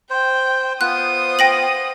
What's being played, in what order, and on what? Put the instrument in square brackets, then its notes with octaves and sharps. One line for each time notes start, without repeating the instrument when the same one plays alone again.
[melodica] C5 [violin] G5
[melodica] B3 F4 [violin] C5 D#6 [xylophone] F#6
[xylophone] G5 A#6 F#7